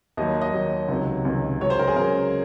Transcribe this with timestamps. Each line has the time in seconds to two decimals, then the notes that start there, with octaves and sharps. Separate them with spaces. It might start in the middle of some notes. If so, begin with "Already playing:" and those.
0.17 D#2 D#3 F#3 D#5
0.42 D#5
0.53 D#2 D#3 F#3
0.88 C#2 C3 D#3 F#3
1.25 C#2 C3 D#3 F#3
1.61 C#2 C#3 F#3 C#5
1.70 C5
1.79 A#4
1.88 G#4
1.96 C#2 C#3 F#3 A#4